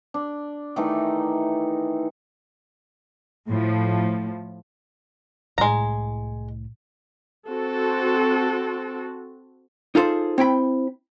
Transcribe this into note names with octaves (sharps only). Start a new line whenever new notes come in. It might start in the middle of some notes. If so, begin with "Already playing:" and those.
D4
D#3 E3 A3 D#4
A2 F3
C2 A2 G#3 A#5
C4 F#4 A4
D#4 F4 G#4 A4 C5
C4 E4 G5 B5